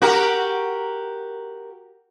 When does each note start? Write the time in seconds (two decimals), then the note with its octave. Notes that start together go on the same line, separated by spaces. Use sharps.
0.02 F#4 G4 A#4